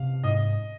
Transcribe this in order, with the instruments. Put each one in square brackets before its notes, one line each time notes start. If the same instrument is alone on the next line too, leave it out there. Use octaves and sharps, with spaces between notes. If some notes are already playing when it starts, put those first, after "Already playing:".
Already playing: [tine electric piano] C3 [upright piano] F5
[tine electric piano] G#2 [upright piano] D#5